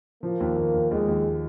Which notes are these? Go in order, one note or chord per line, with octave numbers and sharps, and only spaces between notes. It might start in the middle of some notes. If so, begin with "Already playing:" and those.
F3 A#3
D#2
D#2
D#2
D#2 G#3
D#2